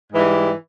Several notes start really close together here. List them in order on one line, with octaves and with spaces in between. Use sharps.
G#2 E3 G3